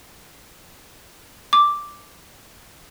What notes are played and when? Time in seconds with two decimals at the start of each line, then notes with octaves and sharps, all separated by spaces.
1.53 D6